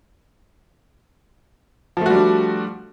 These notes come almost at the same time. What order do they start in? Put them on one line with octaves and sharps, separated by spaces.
F3 A3 F#4 G3 D4